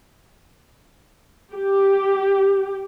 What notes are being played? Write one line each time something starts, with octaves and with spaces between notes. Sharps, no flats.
G4